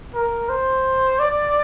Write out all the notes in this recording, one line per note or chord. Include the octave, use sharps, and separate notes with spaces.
A#4
C5
D5